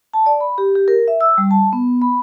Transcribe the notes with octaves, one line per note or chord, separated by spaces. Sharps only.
A5
D5
B5
G4
G4
A#4
E5
E6
G3
A5
B3
B5